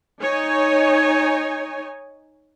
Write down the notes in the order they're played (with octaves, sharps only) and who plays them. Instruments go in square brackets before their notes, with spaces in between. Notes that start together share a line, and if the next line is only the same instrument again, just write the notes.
[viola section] D#4 C#5 G#5